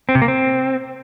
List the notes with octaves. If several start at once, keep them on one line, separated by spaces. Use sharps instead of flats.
C4
C3
A#3
C4